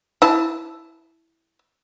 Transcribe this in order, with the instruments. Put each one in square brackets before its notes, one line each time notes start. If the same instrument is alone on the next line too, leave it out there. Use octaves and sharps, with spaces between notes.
[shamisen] E4 A5